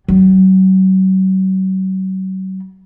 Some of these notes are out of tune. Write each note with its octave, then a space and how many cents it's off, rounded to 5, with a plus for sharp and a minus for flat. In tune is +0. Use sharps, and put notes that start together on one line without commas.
F#3 +35